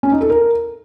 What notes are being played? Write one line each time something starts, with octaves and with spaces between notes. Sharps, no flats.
C#4
D#4
A4
A#4